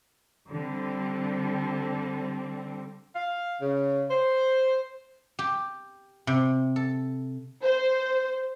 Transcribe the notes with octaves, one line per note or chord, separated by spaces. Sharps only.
D3 G3 C4
F5
C#3
C5
G4
C3
A4
C5